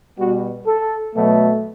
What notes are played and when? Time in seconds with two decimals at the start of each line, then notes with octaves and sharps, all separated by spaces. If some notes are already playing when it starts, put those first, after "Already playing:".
0.18 B2 G3 B3 F#4
0.67 A4
1.15 B2 F#3 A3